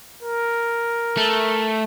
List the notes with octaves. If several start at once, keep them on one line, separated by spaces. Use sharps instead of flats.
A#4
A3